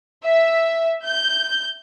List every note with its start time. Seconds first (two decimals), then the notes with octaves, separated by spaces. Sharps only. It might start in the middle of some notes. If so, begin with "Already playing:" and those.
0.24 E5
1.05 G6